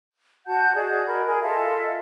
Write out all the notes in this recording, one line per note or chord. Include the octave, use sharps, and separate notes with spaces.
F#4 F#5 A5 G6
F#4 G#4 D5 D#5
F#4 A#4 B5
G#4 A#4
F4 A4 D#5 E5